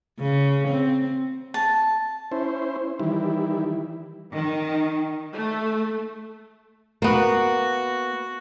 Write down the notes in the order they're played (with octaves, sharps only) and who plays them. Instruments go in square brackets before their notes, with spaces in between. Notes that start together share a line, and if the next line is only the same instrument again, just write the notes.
[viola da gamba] C#3
C4
[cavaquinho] A5
[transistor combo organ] C#4 E4 C5
D#3 E3 G3 E4
[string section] D#3
A3
[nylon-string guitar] A#3 B3 [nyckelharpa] F#4